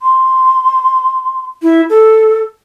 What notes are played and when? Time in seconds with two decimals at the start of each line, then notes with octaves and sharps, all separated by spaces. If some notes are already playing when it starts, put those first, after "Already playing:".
0.02 C6
1.62 E4
1.90 A4